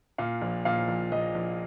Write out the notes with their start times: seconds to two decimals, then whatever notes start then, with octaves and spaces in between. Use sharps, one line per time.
0.18 A#2 F5
0.42 A#1
0.65 A#2 F5
0.88 A#1
1.12 A#1 D#5
1.35 A#1